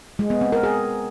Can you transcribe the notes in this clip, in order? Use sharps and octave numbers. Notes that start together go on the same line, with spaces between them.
G#3
B3
C4
A#4
G#4